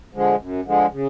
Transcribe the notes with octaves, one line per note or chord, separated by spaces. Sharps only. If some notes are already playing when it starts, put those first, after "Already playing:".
D3 F3 G#3
F#2
D3 F3 G#3
C#3